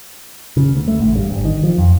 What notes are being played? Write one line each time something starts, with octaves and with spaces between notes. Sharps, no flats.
C#3
D2
A3
A1
G2
G#1
D#3
F3
F2